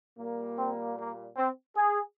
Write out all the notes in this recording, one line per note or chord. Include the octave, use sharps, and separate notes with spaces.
A#2 G3 A#3
C4
A#3
C4
G#4